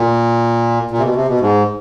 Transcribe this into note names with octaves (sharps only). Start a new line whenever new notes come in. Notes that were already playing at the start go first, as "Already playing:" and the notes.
Already playing: A#2
A#2
C3
B2
C3
B2
G#2